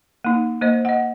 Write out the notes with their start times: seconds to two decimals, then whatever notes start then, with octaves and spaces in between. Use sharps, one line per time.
0.25 A#3 D#4
0.61 A#3 C5 D#5
0.85 D#5 F#5